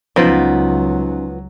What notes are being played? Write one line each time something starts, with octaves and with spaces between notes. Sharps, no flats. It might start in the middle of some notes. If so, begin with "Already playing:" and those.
C#2 F3 F#3 B3 C#4 D#4 F4